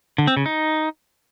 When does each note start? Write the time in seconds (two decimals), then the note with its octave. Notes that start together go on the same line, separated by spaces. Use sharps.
0.18 D3
0.27 C4
0.37 C#3
0.46 D#4